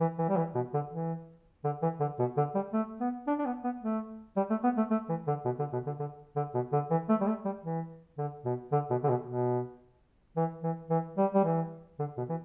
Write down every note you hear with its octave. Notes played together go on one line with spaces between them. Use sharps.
E3
E3
G3
E3
B2
D3
E3
D3
E3
D3
B2
D3
G3
A3
B3
D4
D4
B3
B3
A3
G3
A3
B3
A3
A3
E3
D3
B2
D3
B2
D3
D3
D3
B2
D3
E3
A3
G3
A3
G3
E3
D3
B2
D3
B2
D3
B2
B2
E3
E3
E3
G3
G3
E3
D3
B2
E3